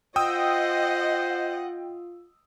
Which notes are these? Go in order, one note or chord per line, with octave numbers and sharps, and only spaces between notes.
F4 C5 D#5 F#5 G5 D#6 E6